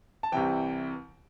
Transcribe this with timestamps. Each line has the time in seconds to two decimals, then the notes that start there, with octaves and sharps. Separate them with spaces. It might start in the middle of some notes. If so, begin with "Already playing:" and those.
0.23 A5
0.32 C2 C3 E3 G5